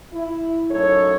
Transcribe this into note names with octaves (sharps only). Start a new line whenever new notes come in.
E4
F#2 A2 D#4 A4 C#5